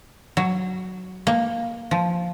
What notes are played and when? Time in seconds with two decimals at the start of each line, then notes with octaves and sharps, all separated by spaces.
0.37 F#3
1.27 A#3
1.91 F3